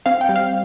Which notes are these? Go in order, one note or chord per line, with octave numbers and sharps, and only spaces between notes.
C4 F5
G5
G3
F5